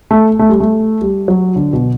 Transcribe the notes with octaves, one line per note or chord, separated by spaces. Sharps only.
A3
A3
G3
A3
G3
F#3
D3
B2